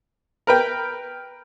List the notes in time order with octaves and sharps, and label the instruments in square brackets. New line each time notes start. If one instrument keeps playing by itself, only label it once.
[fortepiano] A#4 B4 G5